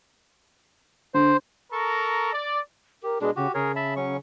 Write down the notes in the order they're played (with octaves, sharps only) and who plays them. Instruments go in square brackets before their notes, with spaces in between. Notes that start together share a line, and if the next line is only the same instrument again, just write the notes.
[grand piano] D3 [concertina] C5
[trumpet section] A4 A#4 A#5 C#6
D5
[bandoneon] G4 [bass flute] A#4
[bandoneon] B2 G#3 D4 [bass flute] G#4
[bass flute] C#3 [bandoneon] F#4 G4
[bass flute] C#3 [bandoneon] G#4 A#4 C#5
[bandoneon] E5 A5 B5
F#3 C#4 C#6